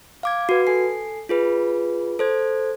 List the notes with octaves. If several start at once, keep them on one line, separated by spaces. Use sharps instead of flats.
F5 D6 G#6
F#4 B4
A4 G#5 C7
F4 G#4 B4
A4 C5 G#6